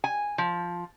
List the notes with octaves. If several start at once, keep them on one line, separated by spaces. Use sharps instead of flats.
G#5
F3